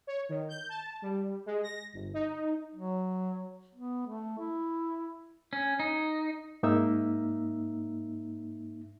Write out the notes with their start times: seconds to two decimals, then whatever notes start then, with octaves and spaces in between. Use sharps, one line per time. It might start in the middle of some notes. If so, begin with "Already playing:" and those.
0.07 C#5
0.29 D#3
0.49 G6
0.69 A5
1.02 G3
1.46 G#3
1.63 A#6
1.93 G1
2.14 D#4
2.75 F#3
3.75 B3
4.07 A3
4.39 E4
5.53 C#4
5.80 D#4
6.63 G#2 A#3 D#4 E5 E6